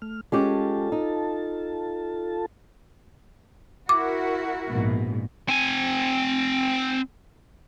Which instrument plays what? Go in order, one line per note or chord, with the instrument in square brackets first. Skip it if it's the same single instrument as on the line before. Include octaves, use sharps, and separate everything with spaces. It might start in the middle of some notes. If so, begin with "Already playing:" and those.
[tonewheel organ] A3 F6
[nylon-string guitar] G#3 C#4 G4 [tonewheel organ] F4 A4 A5
[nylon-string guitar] D#4
[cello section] E4 F#4 A#4 [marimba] D6
[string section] A#1 G#2 B2
[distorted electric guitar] C4 G#5